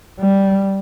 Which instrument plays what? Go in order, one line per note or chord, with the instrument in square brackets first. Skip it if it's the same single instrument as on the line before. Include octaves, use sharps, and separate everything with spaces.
[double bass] G3